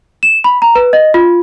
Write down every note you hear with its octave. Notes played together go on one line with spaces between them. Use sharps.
E7
B5
A#5
B4
D#5
F4